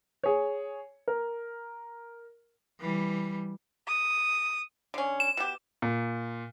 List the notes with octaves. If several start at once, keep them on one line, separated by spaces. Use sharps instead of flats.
G#4 C#5
A#4
E3 G3
D#6
D3 C#4
E7
B2 G4
A#2